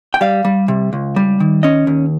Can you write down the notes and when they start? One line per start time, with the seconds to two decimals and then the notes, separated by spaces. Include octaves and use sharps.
0.14 G5
0.21 G3 F5
0.45 G3
0.68 C3
0.93 C#2
1.16 G3
1.40 D#3
1.63 C#4 D#5
1.87 D#2